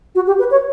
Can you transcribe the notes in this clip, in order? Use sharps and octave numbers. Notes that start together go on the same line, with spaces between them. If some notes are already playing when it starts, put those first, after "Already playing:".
F#4
G4
B4
C#5